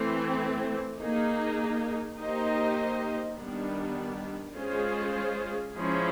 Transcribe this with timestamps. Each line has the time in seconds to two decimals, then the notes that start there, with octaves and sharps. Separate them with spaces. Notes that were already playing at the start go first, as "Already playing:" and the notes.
Already playing: E3 A3 C4
1.00 A#3 D#4 G#4
2.18 A#3 D#4 G4 C5 D#5
3.37 D#3 G3 B3 D4
4.56 G#3 C#4 F4 G#4 C5
5.75 F3 G#3 C#4 E4 G#4